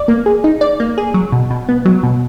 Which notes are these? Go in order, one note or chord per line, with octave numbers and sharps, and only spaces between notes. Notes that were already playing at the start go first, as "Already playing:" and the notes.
Already playing: D5
A#3
G#4
D#4
D5
A#3
G#4
F#3
B2
B2
B3
F#3
B2